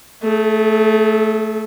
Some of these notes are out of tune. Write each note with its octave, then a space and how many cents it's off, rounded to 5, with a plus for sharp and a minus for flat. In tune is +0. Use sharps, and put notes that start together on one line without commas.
A3 +0 G#4 +40